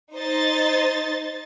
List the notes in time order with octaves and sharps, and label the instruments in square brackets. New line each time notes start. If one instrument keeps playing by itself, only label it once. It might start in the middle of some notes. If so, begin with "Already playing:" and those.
[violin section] D#4 C5 D#5 A6